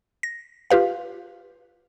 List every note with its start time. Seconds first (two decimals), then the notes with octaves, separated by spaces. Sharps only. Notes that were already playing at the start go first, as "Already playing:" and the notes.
0.23 A#6
0.70 F4 G4 B4 F5